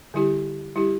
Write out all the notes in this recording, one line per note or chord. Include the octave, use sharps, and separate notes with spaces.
D3 G3 E4 G4
G3 E4 G4